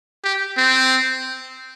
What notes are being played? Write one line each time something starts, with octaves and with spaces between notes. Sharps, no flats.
G4
C4